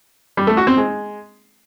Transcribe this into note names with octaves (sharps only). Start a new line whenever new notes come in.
G3
A3
F#4
C4
G#3